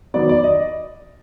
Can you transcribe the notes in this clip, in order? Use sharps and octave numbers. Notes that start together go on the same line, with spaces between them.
D#3 F#3 B3 D5
D5
D#5